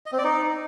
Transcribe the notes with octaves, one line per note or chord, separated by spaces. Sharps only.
D#5
C4
D5
D#4